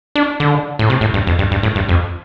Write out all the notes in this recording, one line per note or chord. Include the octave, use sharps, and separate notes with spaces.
D4
D3
A2
C3
A2
G2
F2
G2
G2
A2
G2
F2